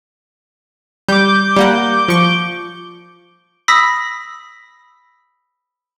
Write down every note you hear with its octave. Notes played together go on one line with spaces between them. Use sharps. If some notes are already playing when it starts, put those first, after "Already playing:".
G3 D6 G6
G3 A#3 F#5
F3 C#6
B5 D#6 E6 A#6 B6